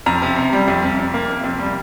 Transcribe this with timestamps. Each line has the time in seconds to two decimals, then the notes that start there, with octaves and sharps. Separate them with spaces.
0.06 F2 A#5
0.22 C3
0.36 C3
0.53 G3
0.68 F2
0.84 C3
0.99 F2
1.14 A#3
1.30 C3
1.44 F2
1.59 G3